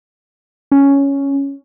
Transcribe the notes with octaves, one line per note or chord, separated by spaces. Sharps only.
C#4